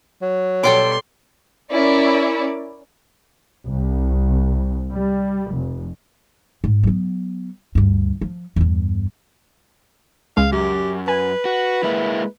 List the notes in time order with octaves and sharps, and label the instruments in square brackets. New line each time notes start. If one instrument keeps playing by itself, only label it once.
[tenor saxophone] F#3
[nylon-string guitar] B2 G3 C#5 [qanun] A4 G5 D6 [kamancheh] C6
[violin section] C#4 E4 A#4 D5
[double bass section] C2
G3
F1
[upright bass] G#2
F#3 B3
D2 G2
F3
E2 G2
[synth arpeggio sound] C#2 G#3 [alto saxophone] F5
[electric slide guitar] F#2 [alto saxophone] G4
[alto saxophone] B4 [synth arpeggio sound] G#5
[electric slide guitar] F#4
G#3 A#3 E4